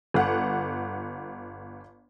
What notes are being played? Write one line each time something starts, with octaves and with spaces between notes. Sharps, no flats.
G1 F#5